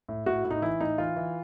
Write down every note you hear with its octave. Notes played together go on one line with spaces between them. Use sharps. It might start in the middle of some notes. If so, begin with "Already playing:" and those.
A2
A2 F#4
A2
D#4
E3 E4
A2 D#4
E3 F4
E3